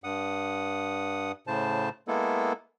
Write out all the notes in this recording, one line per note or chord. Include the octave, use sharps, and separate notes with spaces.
G2 F#5 D#6
A2 C#3 C5 A5
G#3 A#3 B3 E4 A4